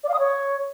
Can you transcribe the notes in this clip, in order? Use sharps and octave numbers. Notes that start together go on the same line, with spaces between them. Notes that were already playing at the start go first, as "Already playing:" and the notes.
D5
F5
D#6
C#5